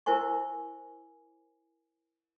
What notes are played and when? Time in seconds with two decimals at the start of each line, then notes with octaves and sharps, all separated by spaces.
0.06 E4 A#4 C5 G#5 C#6